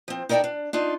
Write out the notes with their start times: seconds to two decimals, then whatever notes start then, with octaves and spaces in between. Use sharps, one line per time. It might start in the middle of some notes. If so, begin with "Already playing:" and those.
0.08 F3 C4
0.29 D#4 A#4 D5 F#5 G5 A5
0.44 D4
0.73 D4 D#4 F4